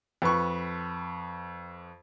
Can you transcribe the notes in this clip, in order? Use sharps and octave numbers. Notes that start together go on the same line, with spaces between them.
F2 B4 C#6